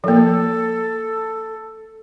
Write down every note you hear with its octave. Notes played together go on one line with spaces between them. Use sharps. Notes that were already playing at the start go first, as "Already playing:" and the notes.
F3 A#3 A4